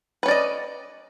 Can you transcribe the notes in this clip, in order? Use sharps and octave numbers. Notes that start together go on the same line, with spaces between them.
C#4 B4 D5 D#5